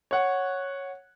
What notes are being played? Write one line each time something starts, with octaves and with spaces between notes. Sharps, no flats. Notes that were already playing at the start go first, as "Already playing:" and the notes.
C#5 F#5